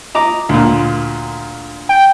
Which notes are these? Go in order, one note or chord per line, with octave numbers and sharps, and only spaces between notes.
D#5 A#5 D6
D2 A#2
G5